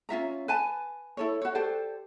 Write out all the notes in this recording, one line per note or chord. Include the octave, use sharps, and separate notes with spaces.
C#4 F4 E5 A#5
B4 G#5 A5
E4 A4 C#5
F#4 C#5
G4 A4 C5 D5